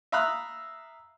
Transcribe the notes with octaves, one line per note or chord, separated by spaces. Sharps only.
E5 F5 A#5 B5 D#6 F#6